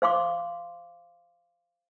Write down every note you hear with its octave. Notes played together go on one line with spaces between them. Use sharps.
C5 F5 C6 D6